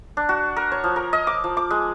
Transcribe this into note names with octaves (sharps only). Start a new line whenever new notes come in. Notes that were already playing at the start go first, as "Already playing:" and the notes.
D4
F#4
A#4
C#5
F3
A#4
D#5
D6
F3
D6
G#3